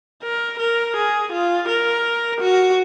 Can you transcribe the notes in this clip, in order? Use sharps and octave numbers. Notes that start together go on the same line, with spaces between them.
A#4
A#4
G#4
F4
A#4
F#4